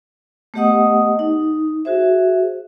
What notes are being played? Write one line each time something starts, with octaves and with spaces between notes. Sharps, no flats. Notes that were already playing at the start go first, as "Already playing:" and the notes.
A3 B3 G4 D#5 F#5 D#6
D#4
F#4 G#4 C5 E5